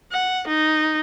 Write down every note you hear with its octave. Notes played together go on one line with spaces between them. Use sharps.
F#5
D#4